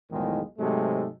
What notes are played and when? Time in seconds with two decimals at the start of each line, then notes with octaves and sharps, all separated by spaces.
0.10 B1 E2 A2 D#3 F3 G#3
0.59 G#2 C3 F#3 G#3 A3